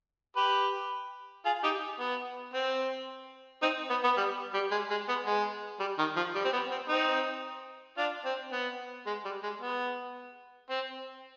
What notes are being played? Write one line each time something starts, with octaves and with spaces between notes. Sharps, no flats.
G4 B4
F4 G#4
D#4 G4
B3
C4
C4 D#4
B3
B3
G3
G3
G#3
G#3
B3
G#3
G3
D#3
F3
G3
C4
B3
C4
C4 D#4
D4 F4
C4
B3
G#3
G3
G#3
B3
C4